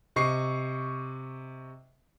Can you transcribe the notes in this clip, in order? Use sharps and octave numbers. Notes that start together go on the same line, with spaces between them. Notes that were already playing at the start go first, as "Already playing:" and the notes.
C3 D#5 C#6 C7